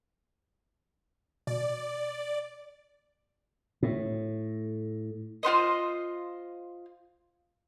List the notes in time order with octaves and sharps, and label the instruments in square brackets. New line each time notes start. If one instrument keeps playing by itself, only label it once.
[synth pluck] B2 [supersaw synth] D5
[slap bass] A2
[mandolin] F4 F#4 C5 D#5